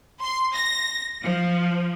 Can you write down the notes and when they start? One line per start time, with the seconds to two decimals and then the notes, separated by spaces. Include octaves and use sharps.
0.22 C6
0.56 A#6
1.23 F3